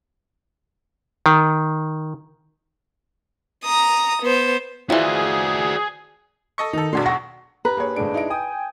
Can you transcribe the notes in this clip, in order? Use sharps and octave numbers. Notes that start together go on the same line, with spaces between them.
D#3
A#5 D#6
B3 C5
E3 F3 F#4 G#4 D5
A4 D#5 C#6
D#3 D#4 A4
B1 E2 D4 F#4 C6
F#5 C#6 A#6
G2 B4 A#5
A#3 G#4 C#5
G#1 A2 G#3 D4 D7
D#4 E4 D7
G5 G#5 D#6